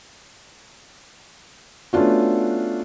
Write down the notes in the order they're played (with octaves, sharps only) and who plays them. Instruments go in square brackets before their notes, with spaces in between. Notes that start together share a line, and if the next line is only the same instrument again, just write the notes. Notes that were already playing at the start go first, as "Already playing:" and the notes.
[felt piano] A3 B3 C#4 D4 F4 F#4